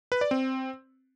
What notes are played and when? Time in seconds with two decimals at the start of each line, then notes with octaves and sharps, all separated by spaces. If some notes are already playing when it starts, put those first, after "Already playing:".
0.12 B4
0.21 D5
0.31 C4